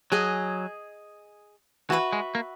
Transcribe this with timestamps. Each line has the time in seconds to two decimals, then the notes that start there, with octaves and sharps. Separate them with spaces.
0.12 F#3 G#4 D#5 G#5
1.90 E3 F#4 B4 E5
2.13 G#3
2.35 A#3